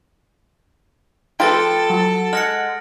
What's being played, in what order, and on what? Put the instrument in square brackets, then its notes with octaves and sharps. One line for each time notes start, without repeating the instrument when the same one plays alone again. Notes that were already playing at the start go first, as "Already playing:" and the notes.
[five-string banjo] F3 F4 B4 [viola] A4 [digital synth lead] G5 [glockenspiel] A6 D7
[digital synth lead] F#3
[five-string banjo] G#3 [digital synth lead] F#5 [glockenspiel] F6 A#6 C#7